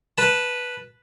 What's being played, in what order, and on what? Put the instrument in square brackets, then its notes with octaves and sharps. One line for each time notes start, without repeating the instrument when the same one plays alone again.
[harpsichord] B4 A5